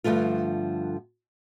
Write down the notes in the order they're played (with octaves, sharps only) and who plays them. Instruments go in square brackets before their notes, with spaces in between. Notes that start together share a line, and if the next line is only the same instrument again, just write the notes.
[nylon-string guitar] G2 D3 F3 A3 F4